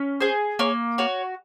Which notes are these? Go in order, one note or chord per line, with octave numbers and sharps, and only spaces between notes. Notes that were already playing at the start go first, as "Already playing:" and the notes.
Already playing: C#4
G#4 C5
A#3 C#5
F#4 C#5